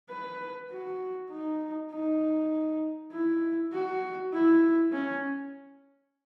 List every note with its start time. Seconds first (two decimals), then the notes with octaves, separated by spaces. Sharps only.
0.10 B4
0.70 F#4
1.30 D#4
1.92 D#4
3.12 E4
3.73 F#4
4.33 E4
4.93 C#4